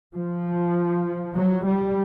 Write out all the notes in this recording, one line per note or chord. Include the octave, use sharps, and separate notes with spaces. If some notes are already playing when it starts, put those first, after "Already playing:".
F3
F#3
G3